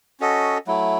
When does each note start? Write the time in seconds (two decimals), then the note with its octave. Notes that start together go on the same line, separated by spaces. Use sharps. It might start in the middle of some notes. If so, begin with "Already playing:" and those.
0.20 C#4 F#4 A4 D#5
0.67 F#3 A3 E4